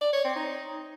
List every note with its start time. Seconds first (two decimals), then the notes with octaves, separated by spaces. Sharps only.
0.01 D5
0.13 C#5
0.25 C4
0.36 D#4